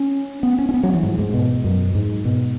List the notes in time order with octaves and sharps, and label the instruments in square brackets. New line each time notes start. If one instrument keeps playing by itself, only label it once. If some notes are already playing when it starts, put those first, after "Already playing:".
Already playing: [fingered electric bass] C#4
B3
C#4
C#4
B3
F#3
E3
G#2
G#2
B2
F#2
G#2
B2